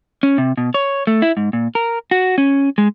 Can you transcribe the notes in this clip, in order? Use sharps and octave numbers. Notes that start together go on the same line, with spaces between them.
C#4
C3
B2
C#5
A3
E4
G#2
A#2
A#4
F#4
C#4
G#3